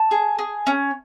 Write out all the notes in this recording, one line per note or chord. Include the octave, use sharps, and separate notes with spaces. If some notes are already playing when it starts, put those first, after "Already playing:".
Already playing: A5
G#4
G#4
C#4